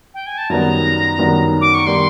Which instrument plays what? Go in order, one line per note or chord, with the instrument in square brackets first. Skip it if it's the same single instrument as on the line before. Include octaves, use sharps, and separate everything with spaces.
[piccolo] G5
G#5
A5
[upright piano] F#2 D#3 G3 B3 [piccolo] A#5
[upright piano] F#2 D#3 G3 B3
[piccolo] D6
C#6
[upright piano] D#3 G3 B3 [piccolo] C6